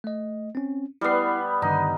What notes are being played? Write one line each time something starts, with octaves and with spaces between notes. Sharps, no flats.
A3 D#5
C4 C#4
G3 B3 E4 C7
G2 D3 D#3 D#4